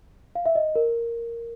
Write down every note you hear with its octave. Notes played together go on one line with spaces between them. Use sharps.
F5
E5
D#5
A#4